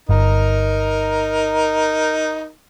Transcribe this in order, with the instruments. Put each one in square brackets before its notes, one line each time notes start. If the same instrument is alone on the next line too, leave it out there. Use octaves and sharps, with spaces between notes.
[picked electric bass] G1 [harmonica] D#4 A#4